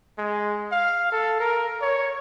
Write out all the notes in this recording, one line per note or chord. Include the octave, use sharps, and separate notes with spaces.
G#3
F5
A4
A#4
C#5